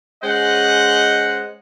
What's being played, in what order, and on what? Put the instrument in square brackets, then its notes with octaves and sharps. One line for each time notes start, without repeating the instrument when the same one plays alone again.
[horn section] G#3 C#4 C5 D#5 F#5